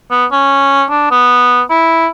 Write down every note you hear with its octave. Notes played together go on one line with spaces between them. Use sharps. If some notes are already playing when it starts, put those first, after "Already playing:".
B3
C#4
D4
B3
E4